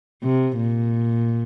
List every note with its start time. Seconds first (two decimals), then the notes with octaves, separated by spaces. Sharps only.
0.23 C3
0.57 A#2